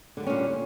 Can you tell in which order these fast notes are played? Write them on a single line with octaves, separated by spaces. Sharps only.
D3 A3 G3 C#4 A#2